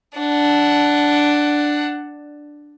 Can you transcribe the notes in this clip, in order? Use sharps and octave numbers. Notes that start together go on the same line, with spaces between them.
D4 F#5